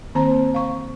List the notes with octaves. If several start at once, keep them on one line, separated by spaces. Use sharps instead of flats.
D#3 A#3 C4 C5 A#5
F5 C#6